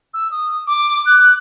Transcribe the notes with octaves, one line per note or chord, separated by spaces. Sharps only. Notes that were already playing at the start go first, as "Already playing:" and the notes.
E6
D#6
D6
F#6